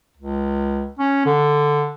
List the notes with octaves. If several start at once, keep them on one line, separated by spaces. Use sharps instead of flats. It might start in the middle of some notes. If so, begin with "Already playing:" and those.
C#2
C#4
D3